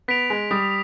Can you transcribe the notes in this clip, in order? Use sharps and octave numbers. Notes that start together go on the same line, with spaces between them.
B3 B6 D7 F7
G#3
G3 D#6